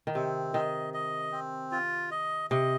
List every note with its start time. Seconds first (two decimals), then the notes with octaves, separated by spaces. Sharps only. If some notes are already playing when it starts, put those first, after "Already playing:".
0.07 D#3
0.15 C3 C4
0.54 D#3 D#5
0.94 D#5
1.32 C4
1.71 F4
2.11 D#5
2.50 C3 D#5